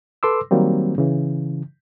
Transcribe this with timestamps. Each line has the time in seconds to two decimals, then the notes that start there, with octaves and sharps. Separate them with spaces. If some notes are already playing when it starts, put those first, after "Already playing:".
0.23 A4 B4 C6 D6 E6
0.51 D#3 F#3 G3 A#3 C4
0.98 C#3 E3